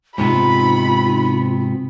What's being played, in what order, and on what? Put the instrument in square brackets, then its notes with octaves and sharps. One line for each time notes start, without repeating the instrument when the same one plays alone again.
[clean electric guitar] G#2 C3 B3 [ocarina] D#4 [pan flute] F4 [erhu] B5